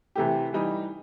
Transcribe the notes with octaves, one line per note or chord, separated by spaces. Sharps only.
C3 E3 A3 E4 G4
E3 G3 D#4